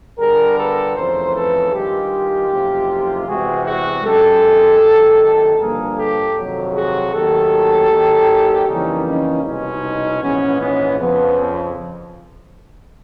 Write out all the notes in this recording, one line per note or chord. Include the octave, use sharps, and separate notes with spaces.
G1 G2 D3 G3 G#4 A#4
A4 B4
F2 C#3 E3 A3 A#4 C5
A4 B4
G2 D#3 G#3 F4 G4
F#1 F2 C3
E2 C3 E3 G#3 F#4 G#4
F#4 G#4
F#2 D#3 G#3 G4 A4
F#1 F#2 D#3
G2 D3 F3 A#3 G#4 A#4
G4 A4
F2 C3 D#3 F#3
F#4 G#4
D#2 D#3 F#3 A3 G4 A4
D#2 D#3 F#3
F2 C#3 E3 G3 A#3 C#4 D#4
C#4 D#4
C2 B2 G#3 C#4 D#4
A#1 G#2 E3 G#3 B3 C#4
B3 C#4
F2 C#3 F3 B3